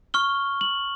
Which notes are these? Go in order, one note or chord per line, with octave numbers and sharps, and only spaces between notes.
C#6 F6 G7
F#7